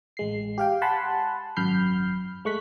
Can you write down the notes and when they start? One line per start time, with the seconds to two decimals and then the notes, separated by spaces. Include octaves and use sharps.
0.17 A1 G#3 C7
0.58 G4 F5 G5
0.82 F#5 G#5 A5 B5 C6
1.56 G#1 F#2 B5 F6 G6 C7
2.45 G#3 A3 C#6 F#6 B6